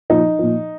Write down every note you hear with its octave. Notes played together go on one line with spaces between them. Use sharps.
A#2 F3 D#4
A#2 F3